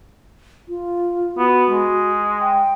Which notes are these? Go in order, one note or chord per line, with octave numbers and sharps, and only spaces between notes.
F4
B3 F#4
G#3
G5